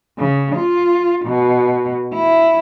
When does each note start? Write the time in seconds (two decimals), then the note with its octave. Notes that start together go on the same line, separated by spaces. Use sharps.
0.18 C#3
0.56 F4
1.26 B2
2.14 E4